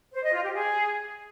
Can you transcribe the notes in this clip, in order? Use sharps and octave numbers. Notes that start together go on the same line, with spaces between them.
C5
D#5
F4
G4
G#4